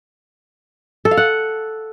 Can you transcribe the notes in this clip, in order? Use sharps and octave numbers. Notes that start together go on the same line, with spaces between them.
A4
F5
F#5